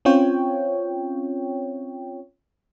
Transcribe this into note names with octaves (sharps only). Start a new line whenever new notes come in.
C4 C#4 F4 C#5 G5